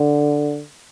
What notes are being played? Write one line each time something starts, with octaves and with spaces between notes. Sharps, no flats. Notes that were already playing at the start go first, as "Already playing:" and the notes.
Already playing: D3